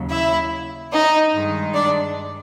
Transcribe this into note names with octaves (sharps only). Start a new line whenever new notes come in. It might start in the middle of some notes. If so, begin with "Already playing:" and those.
Already playing: D#2 C#3 F#3
E4 E5
D#4 D#5
G2 D#3 G#3
D4 D5